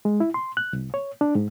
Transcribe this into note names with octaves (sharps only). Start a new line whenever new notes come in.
G#3
E4
C6
F#6
C2
C#5
D4
G#2